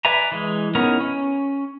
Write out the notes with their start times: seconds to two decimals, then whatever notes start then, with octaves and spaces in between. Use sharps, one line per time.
0.05 B4 D5 E5 G#5 A#5
0.32 E3 G#3
0.75 B3 C#4 D#4 E4 A#4
1.01 C#4